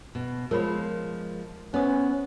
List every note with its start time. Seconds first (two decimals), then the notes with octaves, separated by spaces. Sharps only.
0.15 B2
0.51 F3 G#3 A#4 C#5 B5
1.74 B3 C#4 C5 D#6